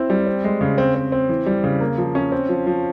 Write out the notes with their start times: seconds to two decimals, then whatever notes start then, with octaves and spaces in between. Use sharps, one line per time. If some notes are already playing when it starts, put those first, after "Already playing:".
Already playing: C4 E4
0.10 G3
0.26 C4
0.44 G#3
0.61 C#3
0.78 C4
0.95 C4
1.12 C4
1.29 E3
1.46 G3
1.64 C#3
1.80 A#3
1.98 F3
2.15 C#4
2.32 C4
2.49 F3
2.66 F3